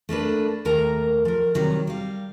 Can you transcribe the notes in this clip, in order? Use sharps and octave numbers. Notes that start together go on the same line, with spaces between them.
A3 A#3 D4 B4
D#2 A3 A#4 A#5
F3 A#4
C3 D#3 F#3 G3
G3 F5